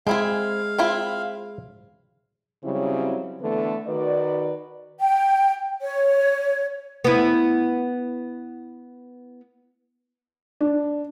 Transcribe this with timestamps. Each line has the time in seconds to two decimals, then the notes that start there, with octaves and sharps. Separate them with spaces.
0.07 G#3 C4 E4 G#4 F5
0.78 C4 E4 F4
2.64 C#3 F#3 G3 C4 E4
3.41 D3 E3 A3 B3 B4
3.87 D#3 F#4 B4 D5
5.00 G5
5.81 C#5
7.04 B3 E4
10.61 D4